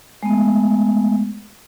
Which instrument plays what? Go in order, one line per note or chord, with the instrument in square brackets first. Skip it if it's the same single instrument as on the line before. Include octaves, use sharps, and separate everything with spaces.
[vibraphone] G#3 A3 B3